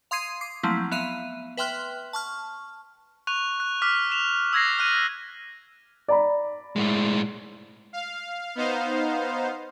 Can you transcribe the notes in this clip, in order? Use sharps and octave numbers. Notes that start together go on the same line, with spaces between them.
F5 C6 D#6 G#6 C7 D#7
D6 C7
F3 F#3 A3 A#3 C4 E4
B3 E5 F5 D#7
B4 E5 G5 C6 F6 F#6
A5 C#6 F6
C#6 F#6 F7
F#6
D6 F6 B6
B6 E7 F7
E6 G#6 A#6 C7
F6 F#6 D#7
D5 A#5 B5
A2 G#3
F5
B3 D#4 C5 F5